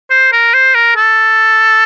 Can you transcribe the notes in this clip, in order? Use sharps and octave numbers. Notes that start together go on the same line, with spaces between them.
C5
A#4
C5
A#4
A4